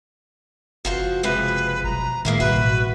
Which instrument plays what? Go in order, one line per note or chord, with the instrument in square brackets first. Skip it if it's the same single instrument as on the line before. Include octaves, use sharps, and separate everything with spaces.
[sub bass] F#1 [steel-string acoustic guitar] F3 F#4 C5
[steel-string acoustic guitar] C3 F3 G#3 [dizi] B4
[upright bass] B2 F#3 [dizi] A#5
[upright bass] A2 [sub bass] D#3 [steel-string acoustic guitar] G#3 A#3 E4
[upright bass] A1 G2 [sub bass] B2 [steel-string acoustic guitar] F#4 [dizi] B4